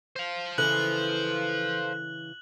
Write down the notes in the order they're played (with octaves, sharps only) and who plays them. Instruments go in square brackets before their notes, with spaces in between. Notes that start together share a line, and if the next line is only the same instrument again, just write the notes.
[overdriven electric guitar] C5 F5
[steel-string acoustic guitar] C#3 E3 [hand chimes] A4 B4 [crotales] F#6 F#7